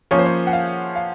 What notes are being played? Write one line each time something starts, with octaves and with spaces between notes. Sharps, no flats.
F3 A#3 C#4 C#5
C5
C#5
F#5
F5
F5